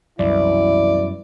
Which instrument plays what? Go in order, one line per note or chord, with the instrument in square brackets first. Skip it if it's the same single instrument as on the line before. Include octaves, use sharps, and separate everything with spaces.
[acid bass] C2 [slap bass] F#2 G3 [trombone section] B2 E3 E4 [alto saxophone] D5